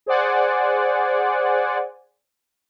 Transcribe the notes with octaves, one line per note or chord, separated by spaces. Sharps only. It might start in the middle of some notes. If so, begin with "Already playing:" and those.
G#4 C5 D5 F#5 G#5